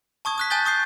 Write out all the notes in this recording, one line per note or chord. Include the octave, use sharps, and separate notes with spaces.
A5 C#6 D#6 G#6
D#6 F#6 B6
G#5 A5 D#6 G6 A6 G7
C#6 D#6 G6 C7